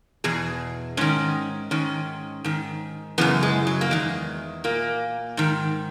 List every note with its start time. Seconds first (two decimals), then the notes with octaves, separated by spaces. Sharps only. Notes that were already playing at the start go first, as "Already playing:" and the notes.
0.24 E2 B2 G#4
0.97 G#2 D#3 C#4
1.71 G#2 D#3 C#4
2.44 G#2 D#3
3.18 F#2 C#3 E3 B3
3.43 G#3
3.67 F#3
3.81 A#3
3.91 E2 D#3 G#3
4.64 A#2 A#3
5.37 G#2 D#3